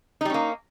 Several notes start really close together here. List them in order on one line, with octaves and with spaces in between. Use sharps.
D#4 G3 C#4 A#3